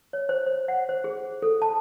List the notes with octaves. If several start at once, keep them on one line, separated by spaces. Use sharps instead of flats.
C#5
C5
C5
F#5
C5
G#4
A4
A5